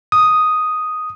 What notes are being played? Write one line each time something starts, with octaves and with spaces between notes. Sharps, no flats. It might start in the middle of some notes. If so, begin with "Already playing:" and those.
D#6